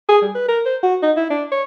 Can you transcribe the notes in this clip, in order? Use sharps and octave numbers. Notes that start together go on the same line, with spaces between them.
G#4
G3
B4
A#4
C5
F#4
D#4
E4
D4
C#5